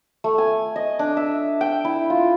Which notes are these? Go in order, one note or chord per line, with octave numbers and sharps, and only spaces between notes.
A3
G#5
D#5
D4
E5
G5
E4
F4